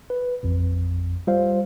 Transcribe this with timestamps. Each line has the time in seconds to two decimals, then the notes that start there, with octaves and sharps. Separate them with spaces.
0.10 B4
0.43 A1 F2
1.27 G3 F4 C5 F5